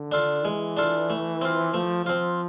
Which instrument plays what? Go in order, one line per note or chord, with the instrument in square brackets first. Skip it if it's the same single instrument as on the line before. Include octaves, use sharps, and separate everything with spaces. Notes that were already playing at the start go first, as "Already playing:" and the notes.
Already playing: [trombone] D3
[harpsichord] D4 F4 A4
[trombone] E3 [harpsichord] G#3
[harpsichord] D4 F4 A4
A3
C4 F4
[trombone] F3 [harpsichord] A3
[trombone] F3 [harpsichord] C4 F4